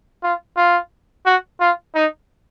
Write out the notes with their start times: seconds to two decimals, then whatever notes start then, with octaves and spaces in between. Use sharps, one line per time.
0.23 F4
0.57 F4
1.26 F#4
1.60 F4
1.95 D#4